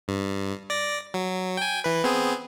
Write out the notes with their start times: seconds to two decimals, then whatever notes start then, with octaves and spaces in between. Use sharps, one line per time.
0.08 G2
0.70 D5 A#6
1.14 F#3
1.57 G5 G#5
1.84 E3 B4
2.04 B3 C4 G#4